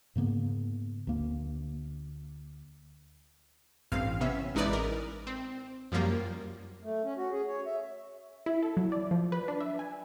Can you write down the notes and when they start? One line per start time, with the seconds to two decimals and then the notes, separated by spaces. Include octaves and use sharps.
0.16 G#2 C#3 A#3 B3
1.07 D2 A#3
3.92 A1 G2 C4 F5
4.20 C3 B3 C#4 E5
4.55 A1 G#3 D#4 E4 B4 D5
4.73 A#4
5.27 C4
5.92 F#2 F3 G3 A#3 F4
6.84 A3
7.04 C#4
7.17 F#4
7.31 G#4
7.47 C#5
7.66 E5
8.46 E4
8.63 A4
8.77 F#3
8.92 D5
9.11 F3
9.32 B4
9.48 D4
9.61 E5
9.79 G#5